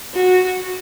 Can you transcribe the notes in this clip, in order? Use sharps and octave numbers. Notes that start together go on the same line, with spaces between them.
F#4